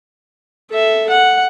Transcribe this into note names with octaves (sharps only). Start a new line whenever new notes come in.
A4 E5
F#5